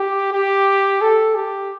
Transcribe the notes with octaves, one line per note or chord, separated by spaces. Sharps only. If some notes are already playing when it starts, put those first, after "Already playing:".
Already playing: G4
G4
A4
G4